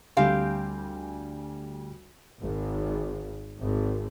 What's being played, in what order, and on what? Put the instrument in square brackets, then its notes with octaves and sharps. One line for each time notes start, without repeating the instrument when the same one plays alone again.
[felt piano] D2 G3 G#5 [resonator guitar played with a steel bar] C4 G4 F5
[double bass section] G#1
G#1